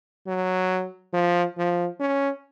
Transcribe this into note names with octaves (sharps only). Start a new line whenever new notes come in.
F#3
F3
F3
C#4